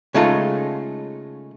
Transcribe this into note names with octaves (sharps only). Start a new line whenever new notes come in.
C#3 G#3 A3 D#4 F4 A4